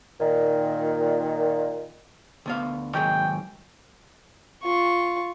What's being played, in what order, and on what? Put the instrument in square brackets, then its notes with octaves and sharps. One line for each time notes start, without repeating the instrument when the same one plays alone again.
[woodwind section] A#2 D#3
[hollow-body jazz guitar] D2 B3 F5
[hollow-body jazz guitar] D#3 F#3 G#3 [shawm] G5
[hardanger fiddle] F4 C#6